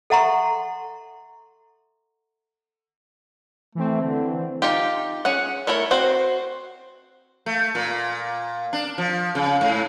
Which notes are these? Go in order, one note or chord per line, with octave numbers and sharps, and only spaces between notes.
A4 E5 F#5 A#5 C6 C#6
E3 A3 C4
D3
D#4 F4 G4
C#4 G#4 F#5
A3 E4 A#4 C#5
C4 F#4 C5
A3
A#2
D4
F3
C#3
G#2